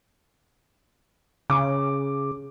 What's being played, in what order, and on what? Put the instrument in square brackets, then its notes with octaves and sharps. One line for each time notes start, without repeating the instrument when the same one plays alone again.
[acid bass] C#3 [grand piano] D6